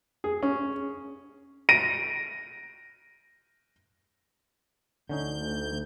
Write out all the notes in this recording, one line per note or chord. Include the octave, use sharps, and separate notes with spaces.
G#4
C#4
A#6 D7 D#7
D2 D3 C#4 D#4 G6